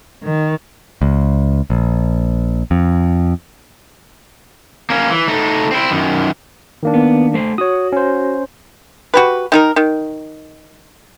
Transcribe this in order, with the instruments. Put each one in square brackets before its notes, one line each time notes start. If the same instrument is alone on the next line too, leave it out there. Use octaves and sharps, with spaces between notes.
[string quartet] D#3
[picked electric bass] C#2
A#1
F2
[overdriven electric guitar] A#3 C#4
E3
A3 D#4
C4 E4
F#2 D#3
[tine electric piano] D#3 A#3 D4
[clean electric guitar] B3
A3 C5
[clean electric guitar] F#4 [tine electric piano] C#5 D#6
[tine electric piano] C#4 C5
[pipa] F#4 G4 B4
D#3 D#4 A#4
D#3